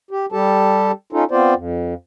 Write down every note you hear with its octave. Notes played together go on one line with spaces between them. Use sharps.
G4
G3 G4 A4 A5
C#4 D#4 F4 A4
B3 C4 F4 C5 D5
F2